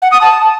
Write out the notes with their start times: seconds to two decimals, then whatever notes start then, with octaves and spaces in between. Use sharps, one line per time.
0.02 F#5
0.12 D#6
0.21 A5